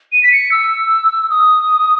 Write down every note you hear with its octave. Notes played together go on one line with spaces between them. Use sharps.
D#7
B6
C#7
E6
D#6